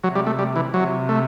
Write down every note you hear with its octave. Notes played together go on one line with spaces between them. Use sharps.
C3 F#3
G3
A3
G3
E3
C3 F#3
A3